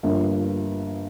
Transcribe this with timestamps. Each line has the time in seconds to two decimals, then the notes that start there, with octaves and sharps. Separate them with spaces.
0.03 G1 G2 F3 A#3